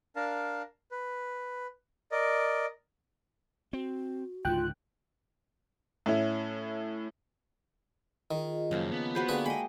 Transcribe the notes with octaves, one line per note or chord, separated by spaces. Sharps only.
D4 A#4 F5 A5
B4
A#4 D5 D#5
C4 F#4
C#2 G#2 D3 F4 G5 F#6
A2 C#4 E4
D#3 F4 G#4 D#5
F#2 C#3 F3 A#3
B3
F#4 G#4 B4 C5 B5
D3 A#3 G#4 B4 G5 A5
G#3 D#5 B5